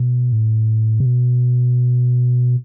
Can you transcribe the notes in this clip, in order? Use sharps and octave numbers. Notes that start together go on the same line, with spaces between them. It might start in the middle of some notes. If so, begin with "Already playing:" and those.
Already playing: B2
A2
C3
B2